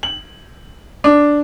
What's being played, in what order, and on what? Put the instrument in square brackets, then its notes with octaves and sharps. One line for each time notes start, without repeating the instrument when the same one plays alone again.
[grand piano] F#7
D4